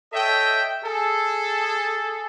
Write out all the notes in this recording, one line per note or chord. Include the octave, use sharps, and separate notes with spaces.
A4 C#5 D#5 E5 G5
G#4 A4